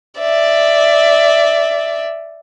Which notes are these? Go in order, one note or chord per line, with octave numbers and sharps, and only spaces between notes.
D5 E5